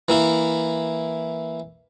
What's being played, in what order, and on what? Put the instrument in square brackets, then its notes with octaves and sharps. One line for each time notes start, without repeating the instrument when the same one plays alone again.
[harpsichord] E3 A#3 E4